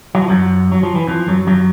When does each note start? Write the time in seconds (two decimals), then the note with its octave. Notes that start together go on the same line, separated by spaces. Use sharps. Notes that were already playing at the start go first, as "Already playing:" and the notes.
0.15 F#3
0.22 F3
0.29 F#2 F#3
0.72 F#3
0.83 F3
0.95 E3
1.07 F2 F3
1.28 F#2 F#3
1.47 F#2 F#3